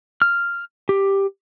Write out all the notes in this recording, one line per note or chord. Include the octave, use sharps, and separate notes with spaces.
F6
G4